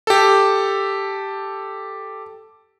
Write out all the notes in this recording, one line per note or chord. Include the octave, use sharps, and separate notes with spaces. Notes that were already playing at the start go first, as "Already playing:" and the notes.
G4 A4